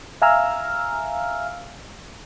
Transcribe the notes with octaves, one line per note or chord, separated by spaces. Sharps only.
E5 F5 G#5 A#5 E6 F6